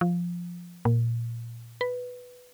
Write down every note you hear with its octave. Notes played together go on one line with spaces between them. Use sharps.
F3
A#2
B4